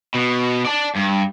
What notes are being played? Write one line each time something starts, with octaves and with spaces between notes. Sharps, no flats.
B2
D5 A5
G2